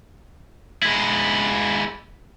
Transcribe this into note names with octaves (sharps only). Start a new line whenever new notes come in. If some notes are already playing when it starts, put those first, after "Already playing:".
G#3 E4